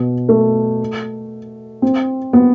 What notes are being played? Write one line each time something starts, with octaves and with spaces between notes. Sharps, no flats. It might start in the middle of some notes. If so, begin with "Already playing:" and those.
Already playing: B2
A3
C4
B3